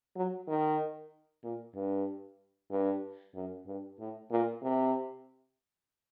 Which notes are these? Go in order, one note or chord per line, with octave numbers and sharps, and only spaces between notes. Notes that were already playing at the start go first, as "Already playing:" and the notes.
F#3
D#3
A#2
G2
G2
F#2
G2
A2
A#2
C3